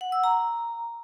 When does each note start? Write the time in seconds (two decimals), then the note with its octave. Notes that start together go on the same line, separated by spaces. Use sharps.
0.01 F#5
0.12 E6
0.24 A#5